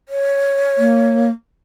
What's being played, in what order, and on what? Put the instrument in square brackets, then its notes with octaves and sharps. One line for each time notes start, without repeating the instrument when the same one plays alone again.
[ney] C#5
[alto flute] A#3